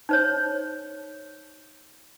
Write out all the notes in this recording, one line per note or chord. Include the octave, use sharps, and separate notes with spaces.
D#4 C5 C#5